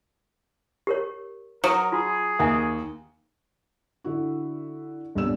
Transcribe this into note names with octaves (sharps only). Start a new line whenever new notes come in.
G4 A#4 C#5
F#3 A#4 D#6
F4 F#4 G#4
D#2 E5 G#5 D#6
D3 E4 F#4
D#1 C2 B2 D4 E6 E7